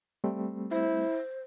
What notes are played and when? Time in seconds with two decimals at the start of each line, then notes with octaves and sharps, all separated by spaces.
0.24 G3 A3 C4
0.71 E4 C5